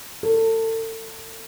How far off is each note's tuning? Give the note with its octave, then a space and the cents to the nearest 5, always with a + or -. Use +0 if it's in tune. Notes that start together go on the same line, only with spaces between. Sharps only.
A4 +35